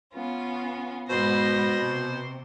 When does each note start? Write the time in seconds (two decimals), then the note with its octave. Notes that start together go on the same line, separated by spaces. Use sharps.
0.14 B3 C#4 F4
1.09 G#2 B2 B3 C5 A#6
1.78 C3